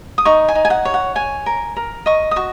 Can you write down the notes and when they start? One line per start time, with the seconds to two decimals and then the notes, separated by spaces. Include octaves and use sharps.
0.18 D#6
0.25 D#4 C#6
0.48 G#5
0.55 D#4
0.65 G#5
0.70 F#5
0.85 C#5
0.94 F#5
1.15 C#5 G#5
1.46 A#4
1.76 A#4
2.06 D#5 C#6
2.31 D#6
2.36 F#4 C#6